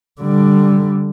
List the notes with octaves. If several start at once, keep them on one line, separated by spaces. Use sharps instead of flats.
D3 G3